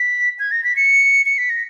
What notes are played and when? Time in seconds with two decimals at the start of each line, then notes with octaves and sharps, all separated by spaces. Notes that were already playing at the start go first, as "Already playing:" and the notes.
Already playing: B6
0.39 G#6
0.51 A#6
0.64 B6
0.76 C#7
1.26 C#7
1.38 B6
1.50 A#6